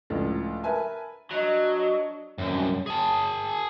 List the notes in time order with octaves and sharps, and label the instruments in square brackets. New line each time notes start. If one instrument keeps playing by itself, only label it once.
[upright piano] C#2 A2 F3 D4
A#4 B4 E5 G#5 A5
[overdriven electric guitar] F#3 [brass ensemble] D4 D#5
[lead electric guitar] C2 F#2
G#4 A5